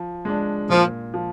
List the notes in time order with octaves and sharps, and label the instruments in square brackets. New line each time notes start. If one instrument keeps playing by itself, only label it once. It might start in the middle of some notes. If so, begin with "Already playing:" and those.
Already playing: [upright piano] F3
G#3 D4
[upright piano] A#2 [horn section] F3
[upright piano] F3